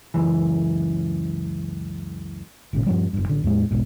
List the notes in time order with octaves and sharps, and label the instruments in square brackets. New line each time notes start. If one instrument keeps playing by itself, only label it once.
[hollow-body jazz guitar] C#2 F#2 E3
[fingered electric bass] G#1 A#2 C#3
G2 F3 G3
F#1 G2
A1 D3
E2 A2 G#3
F1 B1 G#2